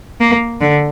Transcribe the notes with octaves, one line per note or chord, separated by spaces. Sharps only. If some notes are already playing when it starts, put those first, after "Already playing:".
A#3
D3